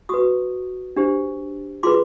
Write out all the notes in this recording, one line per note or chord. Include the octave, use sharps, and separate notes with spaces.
F#4 B4 C#6 D#6
D4 G4 C5
F4 G#4 B4 C6 D6